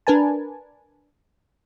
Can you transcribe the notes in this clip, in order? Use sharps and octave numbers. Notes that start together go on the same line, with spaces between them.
D4 A#4 B4 G#5 A5